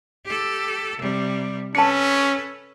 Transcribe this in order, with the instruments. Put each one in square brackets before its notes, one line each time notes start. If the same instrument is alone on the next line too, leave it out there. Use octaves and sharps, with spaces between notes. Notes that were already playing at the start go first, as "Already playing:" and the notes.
[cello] G4 A4
C3 G3
[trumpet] C#4 [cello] A4 B4 [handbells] A5 C#7